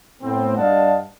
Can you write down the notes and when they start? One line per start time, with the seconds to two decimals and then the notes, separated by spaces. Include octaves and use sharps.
0.21 A2 B3 C4
0.57 G2 D5 D#5 F5 F#5 A5